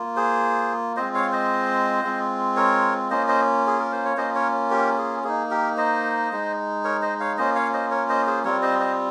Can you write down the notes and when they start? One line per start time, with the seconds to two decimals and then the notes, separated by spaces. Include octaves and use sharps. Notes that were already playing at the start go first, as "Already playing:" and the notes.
Already playing: A#3 F4
0.16 G#4 C5
0.96 G#3 C4 F4 C5 D#5
1.14 C#5 F5
1.32 C5 D#5
2.03 G#3 C4 F4
2.56 A#4 C#5
3.10 A#3 C#4 F4 C5 D#5
3.28 C5 D#5
3.67 G#4
3.79 A#4
3.92 C5
4.05 C#5
4.17 A#3 C#4 F4 C5 D#5
4.35 A#4 C#5
4.71 G4 A#4
4.98 G#4
5.24 A#3 D#4 G#4
5.51 G4 A#4
5.77 C5 D#5
6.31 G#3 D#4
6.84 A#4 C#5
7.02 C5 D#5
7.20 C#5 F5
7.38 A#3 C#4 F4 C5 D#5
7.55 C#5 F5
7.73 C5 D#5
7.91 A#4 C#5
8.09 C5 D#5
8.27 G#4 C5
8.44 G3 C4 F4 A#4 C#5
8.62 C5 D#5
8.80 C5 D#5